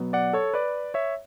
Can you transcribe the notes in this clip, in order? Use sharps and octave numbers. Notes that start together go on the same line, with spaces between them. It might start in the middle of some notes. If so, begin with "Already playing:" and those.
Already playing: B2 F#3 B3
D5 F#5
A4 C#5
B4 D5
C#5 E5